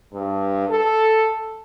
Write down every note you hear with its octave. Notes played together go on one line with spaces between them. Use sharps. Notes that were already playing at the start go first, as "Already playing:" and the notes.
G2
A4